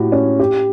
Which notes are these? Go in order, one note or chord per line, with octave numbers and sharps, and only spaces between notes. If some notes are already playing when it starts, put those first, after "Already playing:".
Already playing: A2 F#4 G4
C#4
G4